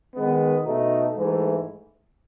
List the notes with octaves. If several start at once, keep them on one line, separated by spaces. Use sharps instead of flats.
D#3 G#3 B3
B2 A3 D#4
G#2 E3 A3